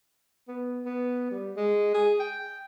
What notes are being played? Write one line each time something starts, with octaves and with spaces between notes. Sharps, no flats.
B3
B3
G3
G#3
G#4
G5